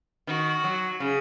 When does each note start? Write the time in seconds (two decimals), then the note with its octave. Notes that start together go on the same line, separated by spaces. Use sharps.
0.27 D#3 F#4
0.64 F#3
1.00 C#3